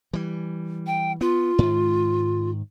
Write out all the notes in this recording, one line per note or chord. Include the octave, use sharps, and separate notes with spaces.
E3 G3
G5
B3 F4
G#2 D#3